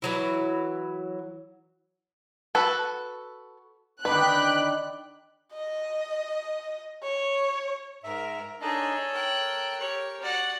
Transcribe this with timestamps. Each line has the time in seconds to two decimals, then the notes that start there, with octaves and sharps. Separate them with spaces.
0.02 E3 F#3 E4
2.55 F#4 A4 B4
4.05 D3 D#3 D4 B4 G5 B5 F#6
5.53 D#5
7.03 C#5
8.04 G#2 A#4 E5
8.61 D4 D#4 G#4 A4 C#5 D#5
9.14 A#4 G5 F#6
9.80 G4 C#5
10.22 F#4 D5 F#5